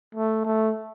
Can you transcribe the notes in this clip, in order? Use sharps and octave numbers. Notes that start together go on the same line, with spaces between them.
A3
A3